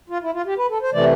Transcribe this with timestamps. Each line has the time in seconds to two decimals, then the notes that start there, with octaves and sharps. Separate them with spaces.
0.10 F4
0.22 E4
0.33 F4
0.46 G4
0.58 B4
0.70 A4
0.82 C5
0.93 C3 E3 A3 D5